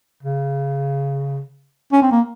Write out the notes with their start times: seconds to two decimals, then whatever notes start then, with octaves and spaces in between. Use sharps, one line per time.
0.23 C#3
1.92 C#4
2.02 C4
2.11 A#3